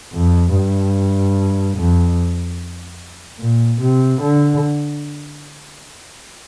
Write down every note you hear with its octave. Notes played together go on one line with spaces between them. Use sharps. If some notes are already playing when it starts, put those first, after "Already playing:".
F2
G2
F2
A#2
C3
D3